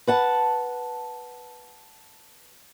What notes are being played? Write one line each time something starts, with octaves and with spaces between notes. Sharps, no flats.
B4 F#5 A5